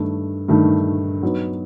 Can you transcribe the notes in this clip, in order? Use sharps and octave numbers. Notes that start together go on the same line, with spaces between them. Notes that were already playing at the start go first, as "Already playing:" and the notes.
Already playing: G2 D#3 A3
G2 D#3 A3
F#3 B3 D#4